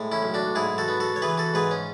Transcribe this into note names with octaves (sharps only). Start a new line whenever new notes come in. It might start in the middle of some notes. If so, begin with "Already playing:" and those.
Already playing: A2 G#3
C#4 E4
B1
D4 F#4
G#2 E4 G#4
F#4 A4
B3
F#4 A4
C#5
E3 G#4 B4
F#4 A4
G#2 G#4 B4
C#4